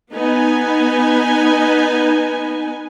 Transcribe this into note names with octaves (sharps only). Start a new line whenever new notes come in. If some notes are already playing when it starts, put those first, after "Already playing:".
B3 D#4 B4 G#5